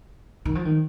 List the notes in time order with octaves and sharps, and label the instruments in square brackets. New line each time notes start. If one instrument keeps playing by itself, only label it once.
[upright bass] D#3
F3
D#3